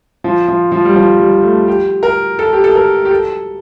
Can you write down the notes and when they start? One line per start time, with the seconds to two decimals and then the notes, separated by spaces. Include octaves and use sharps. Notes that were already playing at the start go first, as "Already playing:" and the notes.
0.24 F3
0.48 F3
0.72 F3
0.85 G3
0.96 F3
1.19 G3
1.44 A3
1.68 G4
2.03 A#4
2.39 A4
2.53 G4
2.64 A4
2.75 A#4
3.05 G4
3.11 A4